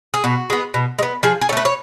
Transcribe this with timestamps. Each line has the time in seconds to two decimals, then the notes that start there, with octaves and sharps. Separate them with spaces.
0.14 G#4
0.24 B2 F#4
0.50 G#3 B3
0.74 B2
0.99 G#3
1.03 B3
1.23 F3 G#4
1.41 G#4
1.49 C#4 A4
1.53 A3 B4
1.65 C#5